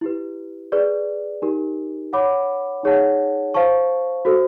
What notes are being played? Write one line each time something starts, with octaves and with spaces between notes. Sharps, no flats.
E4 G4 B4
G#4 B4 D5
D#4 G4 A#4
C#5 F#5 B5 D6
D#4 G#4 C#5 F#5 A5
C5 F5 A5 C#6
F#4 A4 C5